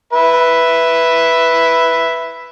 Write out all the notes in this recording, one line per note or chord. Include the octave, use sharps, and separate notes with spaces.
B4 E5